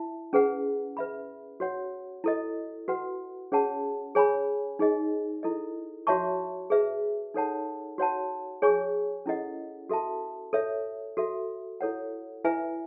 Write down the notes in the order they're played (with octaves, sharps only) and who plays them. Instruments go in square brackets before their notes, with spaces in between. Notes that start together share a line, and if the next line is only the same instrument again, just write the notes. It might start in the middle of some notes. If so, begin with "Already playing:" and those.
Already playing: [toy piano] E4 E5 A5
C#4 G#4 B4 F#5
B4 E5 B5
F#4 C#5 F#5
E4 A4 D#5
F#4 B4 F#5
C#4 G#4 C#5 F#5 A5
G#4 C#5 G#5 B5
D#4 G#4 D#5
E4 A4 D#5
F#4 C#5 E5 A5 C#6
G#4 B4 E5
D#4 A4 C#5 F#5 A5
F#4 C#5 F#5 A5
G#4 C#5 G#5 C#6
C#4 E4 A4 D#5 F#5
F#4 A4 E5 A5
A4 C#5 E5
F#4 A4 E5
E4 A4 C#5 F#5
E4 B4 E5 G#5